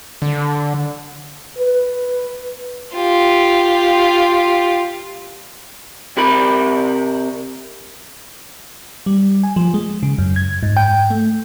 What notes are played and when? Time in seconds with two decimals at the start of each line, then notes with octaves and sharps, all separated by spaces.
0.22 D3
1.59 B4
2.96 F4 G4
6.17 C3 G4 A#4 B5
9.06 G3
9.43 G#5
9.56 F3
9.74 G#3
10.03 C#3
10.18 F#2
10.36 G#6
10.63 G#2
10.77 G5
11.10 A3